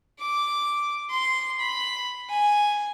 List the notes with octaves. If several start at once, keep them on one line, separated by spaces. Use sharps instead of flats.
D6
C6
B5
G#5